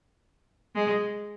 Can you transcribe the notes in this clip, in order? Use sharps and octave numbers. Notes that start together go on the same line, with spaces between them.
G#3